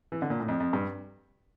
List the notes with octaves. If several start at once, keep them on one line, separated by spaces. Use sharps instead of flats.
E3
D3
A#2
A2
F2
F2
G2